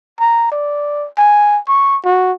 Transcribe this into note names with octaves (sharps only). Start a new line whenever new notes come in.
A#5
D5
G#5
C#6
F#4